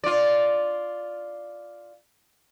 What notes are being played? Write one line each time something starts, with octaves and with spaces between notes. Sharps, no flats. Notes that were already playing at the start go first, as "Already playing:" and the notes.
F4 D5